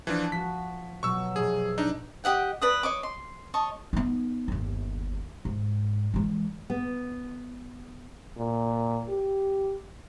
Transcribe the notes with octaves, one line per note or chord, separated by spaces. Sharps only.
E3 F3 D4 A5
F3 F#4 B6
B2 F#3 C#6 E6
F1 B2 G#4
D4 D#4
G4 D#5 F#5 G5
B4 D5 D#6
C#5 D#5 D6
C6
C#5 D#5 A5 C#6
B3 D#4
G1 D#2
G#2
E3 G#3
B3
A#2
G4